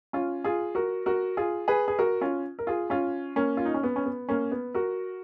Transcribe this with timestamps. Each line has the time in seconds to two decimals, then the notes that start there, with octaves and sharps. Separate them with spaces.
0.13 C#4 F4
0.44 F4 G#4
0.75 F#4 A#4
1.06 F#4 A#4
1.37 F4 G#4
1.68 G#4 B4
1.88 G#4
1.99 F#4 A#4
2.21 C#4 F4
2.59 A#4
2.67 F4 G#4
2.90 C#4 F4
3.36 A#3 C#4
3.57 F4
3.65 D#4
3.74 C#4
3.83 B3
3.96 C#4
4.05 B3
4.29 A#3 C#4
4.51 B3
4.75 F#4 A#4